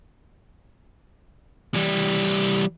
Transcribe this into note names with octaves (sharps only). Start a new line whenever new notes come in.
E3 G3